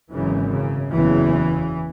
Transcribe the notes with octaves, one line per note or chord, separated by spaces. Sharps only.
G#1 F#2 C#3 E3
C#3
F#1 E2 C#3 E3